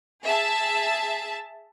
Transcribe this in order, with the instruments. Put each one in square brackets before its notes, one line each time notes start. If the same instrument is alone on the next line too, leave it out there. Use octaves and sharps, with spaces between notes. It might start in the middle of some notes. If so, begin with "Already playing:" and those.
[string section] G#4 E5 A5